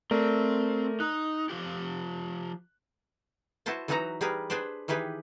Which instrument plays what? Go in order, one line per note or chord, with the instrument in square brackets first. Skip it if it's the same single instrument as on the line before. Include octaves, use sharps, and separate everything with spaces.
[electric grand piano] A3 A#4 D5 [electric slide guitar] C4
[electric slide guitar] D#4 [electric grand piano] F#6
[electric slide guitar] F3 F4 G4
[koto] E4 F#4 B4 C5 A5
E3 F#3 D#4 F#4 B4 A#5
G3 G#4 A#4 B4
D4 G#4 B4 C5 D5
D#3 E3 G4 G#4 B4